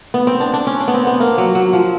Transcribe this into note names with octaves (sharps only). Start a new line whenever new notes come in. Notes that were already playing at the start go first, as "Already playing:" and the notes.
B3
C4
D4
D4
C#4
D4
B3
C4
B3
A#3
F#3
F#3
F3